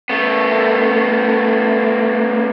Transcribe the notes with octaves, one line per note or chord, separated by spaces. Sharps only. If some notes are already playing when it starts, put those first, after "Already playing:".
A3 B3